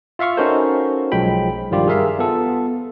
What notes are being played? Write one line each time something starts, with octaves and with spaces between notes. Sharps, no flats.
F4 E5 F5 C#6 F6
C#4 D#4 F#4 A4 A#4 C5
B1 F3 F#3 G#3 G5 B5
G2 D#3 F3 G3 F4 G4
G#4 A#4 E5 F5 C6
B3 F4 A4